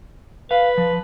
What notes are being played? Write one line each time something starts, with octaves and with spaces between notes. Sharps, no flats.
B4 F5
F3